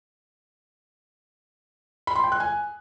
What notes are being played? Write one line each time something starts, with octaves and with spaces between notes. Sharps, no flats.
B5
C6
G5
F#6
G#5